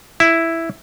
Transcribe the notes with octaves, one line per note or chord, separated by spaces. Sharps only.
E4